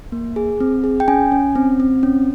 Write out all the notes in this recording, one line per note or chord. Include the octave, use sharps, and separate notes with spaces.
A#3
G#4
C4
G#4
G5
C#4 G#5
C#4
C4
C4
C#4